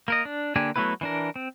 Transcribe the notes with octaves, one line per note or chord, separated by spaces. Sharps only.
A#3 A#4 D#5
D4
D3 A#3 D4 G4 G#5
F#3 A3 B3 E4 B4
E3 D4 A#4
C4